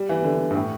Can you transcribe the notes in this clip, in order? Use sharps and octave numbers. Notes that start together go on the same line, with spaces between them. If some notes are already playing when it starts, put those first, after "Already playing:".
Already playing: G3
E3
D3
G2
A2